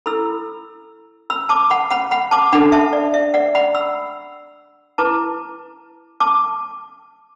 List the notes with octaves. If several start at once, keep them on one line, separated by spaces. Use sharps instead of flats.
E4 A4 B5 E6
B5 E6
A5 D6
F#5 B5
F#5 B5
F#5 B5
A5 D6
D4 A4 F#5 B5
E5 A5
D5
E5
D5 F#5
F#5 B5
B5 E6
E4 B4 A5 D6
A5 D6